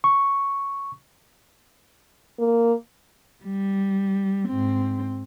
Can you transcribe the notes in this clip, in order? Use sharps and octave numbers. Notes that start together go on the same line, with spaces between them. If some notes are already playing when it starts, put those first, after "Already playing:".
C#6
A#3
G3
G#2 C4